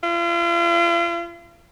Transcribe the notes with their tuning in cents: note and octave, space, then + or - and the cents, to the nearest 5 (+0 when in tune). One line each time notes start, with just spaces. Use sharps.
F4 -40